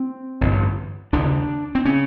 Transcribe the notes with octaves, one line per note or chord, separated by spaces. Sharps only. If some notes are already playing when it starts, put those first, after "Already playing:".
Already playing: C4
A1 G2 D3
F1 D#2 C#3 D4
C4
C#3 C#4